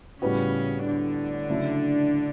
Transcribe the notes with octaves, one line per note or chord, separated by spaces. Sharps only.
A2 C#3 G3 B3 C#4 F#4
D3 D4
C#3 F#3 A3 E4